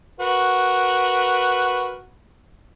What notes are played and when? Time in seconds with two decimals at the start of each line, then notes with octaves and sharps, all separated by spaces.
0.20 F#4 A#4 B4